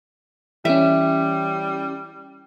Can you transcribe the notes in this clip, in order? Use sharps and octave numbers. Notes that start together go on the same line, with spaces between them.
E3 G3 C#4 E5